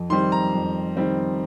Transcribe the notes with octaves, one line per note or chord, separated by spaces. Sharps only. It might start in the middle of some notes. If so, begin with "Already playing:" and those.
Already playing: F2
D#3 G3 C4 C6
A#5
F2
D#3 G3 C4